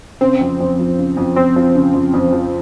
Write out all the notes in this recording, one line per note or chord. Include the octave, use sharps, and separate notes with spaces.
C#3 C4
F2
F2
F3
C#3
F2
F2 C4
F3
C#3
F2
F2
F3